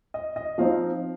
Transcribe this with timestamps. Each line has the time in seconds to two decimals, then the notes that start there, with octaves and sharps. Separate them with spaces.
0.14 D#5
0.36 D#5
0.58 F3 C4 D#4 F5